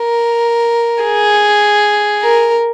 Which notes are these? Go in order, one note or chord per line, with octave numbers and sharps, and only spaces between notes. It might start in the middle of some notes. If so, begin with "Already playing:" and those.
Already playing: A#4
G#4
A#4